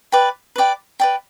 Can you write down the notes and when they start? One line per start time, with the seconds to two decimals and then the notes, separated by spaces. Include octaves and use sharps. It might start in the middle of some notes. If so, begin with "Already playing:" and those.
0.12 B4 D5 G5
0.56 B4 D5 G5
1.00 B4 D5 G5